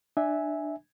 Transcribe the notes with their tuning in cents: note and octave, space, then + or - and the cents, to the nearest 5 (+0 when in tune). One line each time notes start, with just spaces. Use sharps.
D4 +20 E5 -10 G#5 +0